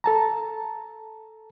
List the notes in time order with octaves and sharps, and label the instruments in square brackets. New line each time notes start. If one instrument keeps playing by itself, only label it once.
[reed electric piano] A4 A5 A#5